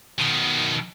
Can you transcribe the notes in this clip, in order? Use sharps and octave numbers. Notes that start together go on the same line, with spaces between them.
B2 D#3